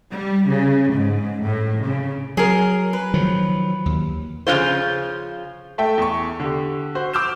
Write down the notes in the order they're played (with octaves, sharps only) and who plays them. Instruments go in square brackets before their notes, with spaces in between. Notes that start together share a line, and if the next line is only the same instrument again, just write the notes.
[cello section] G3
C#3
G#2
A2
C#3
[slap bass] F#3 [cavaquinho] G#4 A#4
[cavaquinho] B4
[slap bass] D#3 F3 F#3
D#2
[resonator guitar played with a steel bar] C#3 F3 G#3 C#4 F4 C5
[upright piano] A3 A4 E5 G5
E2 C#6
D3 G4
F#4 C5
D6 E6 F6 G6 E7